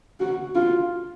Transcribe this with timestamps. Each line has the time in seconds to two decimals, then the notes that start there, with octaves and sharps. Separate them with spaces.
0.20 F#4
0.55 F4